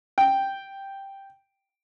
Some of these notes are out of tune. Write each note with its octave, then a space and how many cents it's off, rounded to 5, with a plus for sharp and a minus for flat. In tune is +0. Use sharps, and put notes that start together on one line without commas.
G5 +0